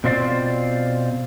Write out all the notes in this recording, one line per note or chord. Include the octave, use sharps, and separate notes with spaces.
B2 C4 F4 C5 D5